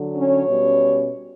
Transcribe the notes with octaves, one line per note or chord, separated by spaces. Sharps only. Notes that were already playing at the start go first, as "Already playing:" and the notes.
Already playing: D3 F#3
C#4 C#5
B2 G3 C#4